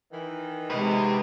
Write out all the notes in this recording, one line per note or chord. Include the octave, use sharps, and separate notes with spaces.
D#3 E3
C3 G#3 B4 D#5